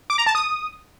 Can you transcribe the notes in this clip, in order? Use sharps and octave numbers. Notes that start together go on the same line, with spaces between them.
D6
A#5
A5
D#6